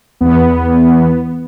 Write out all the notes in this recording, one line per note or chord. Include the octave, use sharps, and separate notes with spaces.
E2 B3